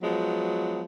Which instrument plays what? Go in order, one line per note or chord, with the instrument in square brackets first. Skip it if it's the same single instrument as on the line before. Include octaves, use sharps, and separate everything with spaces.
[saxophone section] F3 F#3 G#3 B3